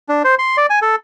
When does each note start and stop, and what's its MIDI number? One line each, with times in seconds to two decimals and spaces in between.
0.09 0.22 62
0.25 0.35 72
0.39 0.57 84
0.57 0.66 74
0.70 0.79 80
0.82 0.96 69